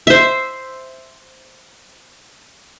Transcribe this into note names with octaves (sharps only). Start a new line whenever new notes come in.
C5 E5